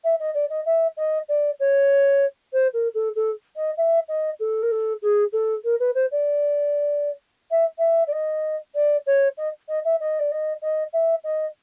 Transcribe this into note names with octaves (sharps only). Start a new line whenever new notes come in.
E5
D#5
D5
D#5
E5
D#5
D5
C#5
C5
A#4
A4
A4
D#5
E5
D#5
A4
A#4
A4
G#4
A4
A#4
B4
C5
D5
E5
E5
D5
D#5
D5
C#5
D#5
D#5
E5
D#5
D5
D#5
D#5
E5
D#5